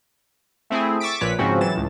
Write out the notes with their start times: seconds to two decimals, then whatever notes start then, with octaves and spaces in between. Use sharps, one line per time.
0.70 A3 C4 E4 G#4
1.00 C#6 D6 E6 A6 B6 D7
1.21 A#1 A#2 B4 C#5 B6
1.39 G#2 C#3 F3 C4 C#4 F#4
1.61 E3 F#3 A6 E7
1.75 C#2 A2